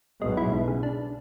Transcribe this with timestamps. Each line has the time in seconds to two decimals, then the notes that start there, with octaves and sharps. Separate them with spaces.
0.22 B1 B2 G#3
0.37 E4
0.52 G#2
0.68 C#3
0.83 D4